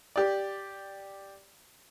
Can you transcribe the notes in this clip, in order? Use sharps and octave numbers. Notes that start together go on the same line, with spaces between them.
G4 D5